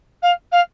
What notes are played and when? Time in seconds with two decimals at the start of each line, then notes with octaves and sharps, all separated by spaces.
0.22 F5
0.52 F5